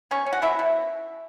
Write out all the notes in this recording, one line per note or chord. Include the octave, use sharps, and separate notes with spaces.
B2 C#4 C#5
C#4
F#4 F#5
B2 E4 E5
B2